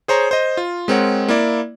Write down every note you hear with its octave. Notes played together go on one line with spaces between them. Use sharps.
G#4 C5 C#5 A#5
C5 D#5
F4
G#3 C4 A#4 C#5 F#5
A#3 E4 D5